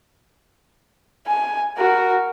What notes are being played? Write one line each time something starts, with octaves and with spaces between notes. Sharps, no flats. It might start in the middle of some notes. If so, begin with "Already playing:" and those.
G#5
F#4 A#4